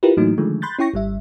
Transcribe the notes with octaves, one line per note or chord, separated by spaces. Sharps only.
E4 F4 G4 A#4 B4
A2 E3 F#3 A3 A#3 D#4
D3 D#3 F3 G#3 A3
B5 C6 F#6 G6 A6
C#4 E4 G5 C#6 A#6
G#1 G3 E5